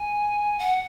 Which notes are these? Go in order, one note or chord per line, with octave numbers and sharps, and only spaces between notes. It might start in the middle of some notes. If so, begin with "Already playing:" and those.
Already playing: G#5
F#5